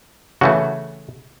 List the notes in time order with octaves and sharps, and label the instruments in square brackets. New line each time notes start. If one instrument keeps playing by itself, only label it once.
[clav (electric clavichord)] C#3 E3 A3 F#4